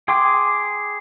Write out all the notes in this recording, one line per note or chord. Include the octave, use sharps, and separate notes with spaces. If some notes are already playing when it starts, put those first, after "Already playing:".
G#4 G5 C6 D6